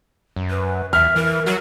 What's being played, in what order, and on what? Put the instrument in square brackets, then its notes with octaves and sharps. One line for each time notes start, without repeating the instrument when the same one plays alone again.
[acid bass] F#2
[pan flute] B4
[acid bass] E2 [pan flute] E5 [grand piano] F6
[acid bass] E3 [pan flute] A#4
[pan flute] F#3 [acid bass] F#4